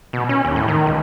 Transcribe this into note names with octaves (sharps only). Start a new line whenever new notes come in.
B2
C#4
D#2
A2
D#3
C#2